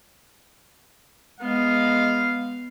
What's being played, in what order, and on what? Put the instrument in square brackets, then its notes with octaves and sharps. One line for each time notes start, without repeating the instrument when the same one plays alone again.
[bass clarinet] G#3 [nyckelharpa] B3 [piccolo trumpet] F5